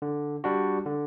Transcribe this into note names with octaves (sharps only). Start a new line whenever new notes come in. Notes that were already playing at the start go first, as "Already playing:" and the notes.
D3
G3 D4 F#4
D3